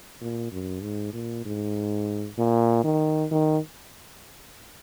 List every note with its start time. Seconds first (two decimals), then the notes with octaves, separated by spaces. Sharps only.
0.21 A#2
0.52 F#2
0.83 G#2
1.13 A#2
1.46 G#2
2.38 A#2
2.84 D#3
3.32 D#3